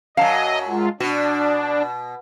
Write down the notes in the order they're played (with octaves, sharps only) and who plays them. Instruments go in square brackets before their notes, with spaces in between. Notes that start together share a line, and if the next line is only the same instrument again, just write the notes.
[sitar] F#2 F#3 [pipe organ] D#5 [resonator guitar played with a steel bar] F5 A5
[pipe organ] G#3 F4
[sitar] B2 [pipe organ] D4 [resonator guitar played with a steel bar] F#4